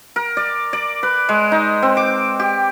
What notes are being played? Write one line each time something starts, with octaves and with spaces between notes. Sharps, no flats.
A#4
D5
D5
B4
G#3
D#4
C4
D6
G4